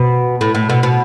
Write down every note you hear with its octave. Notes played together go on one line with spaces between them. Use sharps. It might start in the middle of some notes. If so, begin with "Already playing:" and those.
Already playing: B2
A2
A2
B2
B2